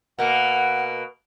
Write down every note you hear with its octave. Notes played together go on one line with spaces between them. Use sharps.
B2 A#3 F#5